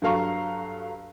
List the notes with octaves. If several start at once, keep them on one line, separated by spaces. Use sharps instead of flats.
G2 F#3 A4 F5 A#5 C#6